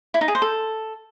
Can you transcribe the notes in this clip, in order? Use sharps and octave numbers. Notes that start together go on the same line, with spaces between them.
E4
D#4
G#4
C5
A4